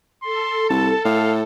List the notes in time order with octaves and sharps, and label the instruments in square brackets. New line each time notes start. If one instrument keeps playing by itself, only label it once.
[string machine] A4 [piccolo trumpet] C6
[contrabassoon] C2 [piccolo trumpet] A5
[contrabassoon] A2 [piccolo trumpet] F5